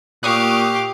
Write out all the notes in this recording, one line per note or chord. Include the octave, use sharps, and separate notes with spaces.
A#2 G4 F5 C#6 D#6 F#6